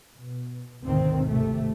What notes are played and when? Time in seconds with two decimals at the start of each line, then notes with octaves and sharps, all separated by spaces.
0.16 B2
0.84 G#1 D2 B2 D#3 C4
1.27 G#1 C3 A3